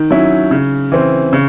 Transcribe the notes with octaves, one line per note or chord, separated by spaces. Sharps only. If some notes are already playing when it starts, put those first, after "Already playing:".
Already playing: D#3
F#3 C#4 E4
C#3
E3 C4
C#3